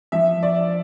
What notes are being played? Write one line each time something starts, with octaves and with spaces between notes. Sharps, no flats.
F3 E5
D5